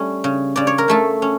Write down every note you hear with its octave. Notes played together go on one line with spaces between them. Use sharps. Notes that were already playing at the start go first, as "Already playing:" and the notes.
Already playing: G3 A3 C#4
C#3
C#3 D5
C#5
A#4
C#3 A3 A4
C#4